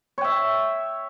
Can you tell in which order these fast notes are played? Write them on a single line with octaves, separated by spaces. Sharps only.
C#5 G5 E5